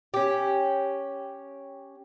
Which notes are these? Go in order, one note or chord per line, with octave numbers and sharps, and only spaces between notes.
C#4 G4